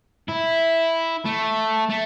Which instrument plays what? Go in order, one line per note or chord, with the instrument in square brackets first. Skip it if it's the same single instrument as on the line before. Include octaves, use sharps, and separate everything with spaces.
[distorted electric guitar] E4
A3
A3